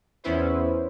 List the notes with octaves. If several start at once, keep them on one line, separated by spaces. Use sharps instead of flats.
E2 B3 C#4 E4 B4 C5